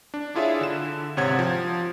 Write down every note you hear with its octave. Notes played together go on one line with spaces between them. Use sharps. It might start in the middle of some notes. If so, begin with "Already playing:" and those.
D4
D4 E4 F4 G#4 C#5 E5
D3 E7
G#1 C3 C#5 F#5 G#6
F3